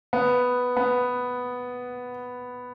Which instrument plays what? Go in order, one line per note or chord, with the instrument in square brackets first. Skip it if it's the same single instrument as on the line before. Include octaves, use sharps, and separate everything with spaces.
[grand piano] B3
B3